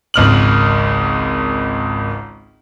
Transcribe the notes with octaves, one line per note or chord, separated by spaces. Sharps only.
G#1 C#2 F6 F#7